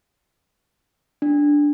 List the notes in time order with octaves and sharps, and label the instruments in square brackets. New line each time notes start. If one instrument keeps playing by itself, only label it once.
[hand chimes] D4